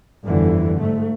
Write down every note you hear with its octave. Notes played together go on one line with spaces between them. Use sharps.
G1 F2 D3 E3
G#2 A3